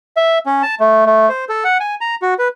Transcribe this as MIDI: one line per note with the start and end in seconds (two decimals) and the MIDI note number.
0.17 0.38 76
0.46 0.62 61
0.63 0.75 81
0.80 1.04 57
1.06 1.29 57
1.29 1.45 72
1.49 1.64 69
1.64 1.78 78
1.80 1.95 80
2.01 2.15 82
2.22 2.34 66
2.39 2.48 71